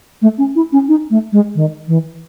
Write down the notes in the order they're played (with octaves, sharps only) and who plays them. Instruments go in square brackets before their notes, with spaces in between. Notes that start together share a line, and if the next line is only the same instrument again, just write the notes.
[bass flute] A3
C#4
E4
C#4
D#4
A3
G#3
D#3
E3